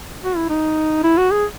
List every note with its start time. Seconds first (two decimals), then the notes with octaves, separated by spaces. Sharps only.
0.24 F#4
0.36 E4
0.49 D#4
1.04 E4
1.18 F#4
1.31 G#4